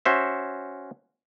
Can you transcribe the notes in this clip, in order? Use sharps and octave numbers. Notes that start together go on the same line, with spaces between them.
C#4 F#4 C5 E5